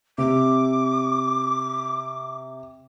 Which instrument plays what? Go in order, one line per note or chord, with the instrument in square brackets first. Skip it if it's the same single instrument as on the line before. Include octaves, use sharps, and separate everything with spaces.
[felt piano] C3 [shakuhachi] D6